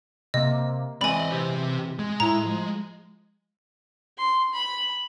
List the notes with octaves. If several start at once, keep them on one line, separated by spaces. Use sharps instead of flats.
C3 A#3 D#5
E3 G#3 C4 D5 D#5 G#5 B5
C3 G4
G#3
A2 E4 A#5
F3
C6
B5